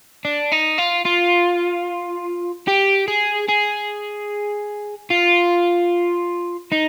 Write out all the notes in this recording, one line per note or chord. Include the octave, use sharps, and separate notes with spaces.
D4
D#4
F4
F4
G4
G#4
G#4
F4
D#4